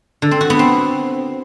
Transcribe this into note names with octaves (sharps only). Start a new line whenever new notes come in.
D3
C4
F#4
B3
C4